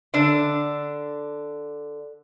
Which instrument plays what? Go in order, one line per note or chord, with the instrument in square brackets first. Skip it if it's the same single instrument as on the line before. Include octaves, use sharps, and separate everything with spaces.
[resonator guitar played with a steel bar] D3 D4